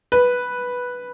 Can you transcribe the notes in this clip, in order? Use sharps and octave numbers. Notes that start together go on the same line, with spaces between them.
B4